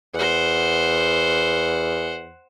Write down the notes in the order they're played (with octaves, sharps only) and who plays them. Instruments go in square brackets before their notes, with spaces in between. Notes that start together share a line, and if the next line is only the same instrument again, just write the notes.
[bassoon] E2 [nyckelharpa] C5 F#5